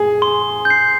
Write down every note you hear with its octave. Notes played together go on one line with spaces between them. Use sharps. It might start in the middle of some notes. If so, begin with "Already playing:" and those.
Already playing: G#4
C6
G6
C7